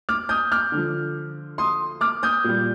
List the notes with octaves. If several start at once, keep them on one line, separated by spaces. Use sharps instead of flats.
D6 F6
D#6 G6
D6 F6
D3 F3
C6 D#6
D6 F6
D#6 G6
A#2 G3